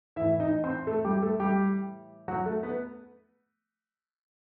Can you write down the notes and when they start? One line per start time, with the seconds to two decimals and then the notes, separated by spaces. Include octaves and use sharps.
0.16 E3 E4 E5
0.21 A2
0.40 D#4 D#5
0.64 C4 C5
0.87 A3 A4
1.05 G3 G4
1.22 A3 A4
1.40 G3 G4
2.28 F#3 F#4
2.46 A3 A4
2.63 B3 B4